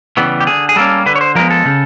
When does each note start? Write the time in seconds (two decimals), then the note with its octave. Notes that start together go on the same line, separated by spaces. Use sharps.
0.17 C#3 E3 G3 B3
0.40 G4
0.47 D3 G#4
0.69 G#4
0.76 G3 A#3 C#4 A4
1.06 D3 B4
1.16 C#5
1.21 C5
1.35 F3 G#3 B3 A#4
1.51 A4
1.65 C#3